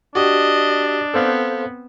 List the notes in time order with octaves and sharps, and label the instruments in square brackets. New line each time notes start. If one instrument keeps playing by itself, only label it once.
[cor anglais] D4 [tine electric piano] F#4 G4 [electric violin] D#5
[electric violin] B3 C4 [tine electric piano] A4 C5 F5